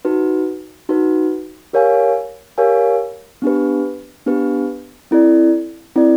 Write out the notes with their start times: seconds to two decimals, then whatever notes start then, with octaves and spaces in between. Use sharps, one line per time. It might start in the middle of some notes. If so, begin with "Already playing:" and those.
0.05 D#4 F#4 B4
0.89 D#4 F#4 B4
1.73 G4 A#4 C#5 F5 G#5
2.58 G4 A#4 C#5 F5 G#5
3.42 B3 D4 G4 B4
4.26 B3 D4 G4 B4
5.11 C4 E4 A4 D5
5.96 C4 E4 A4 D5